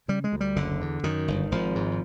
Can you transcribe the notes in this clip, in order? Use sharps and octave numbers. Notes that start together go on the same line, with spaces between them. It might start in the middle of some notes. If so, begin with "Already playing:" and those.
C#3 G3
G#3
D2
G3
F#1 D3
E2
F#2 D#3
G1
G#1 F3
G#2